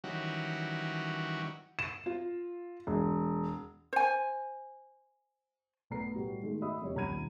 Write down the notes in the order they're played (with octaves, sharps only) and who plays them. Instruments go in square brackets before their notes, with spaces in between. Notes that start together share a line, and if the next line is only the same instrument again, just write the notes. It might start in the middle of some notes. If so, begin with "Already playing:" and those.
[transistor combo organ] D#3 E3 F#3 G3 C#4 F#4
[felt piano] E7
F4
E1
[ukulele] C5 G#5
[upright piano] B1 A3 B3 A#5 C7
A2 G3 F#4
B2 D#3 G#3 A3
F#4 D#5 E5 B5 D#6 E6
F#1 F2 G3 C#5
D#1 B1 A#5 B5 G#6 D#7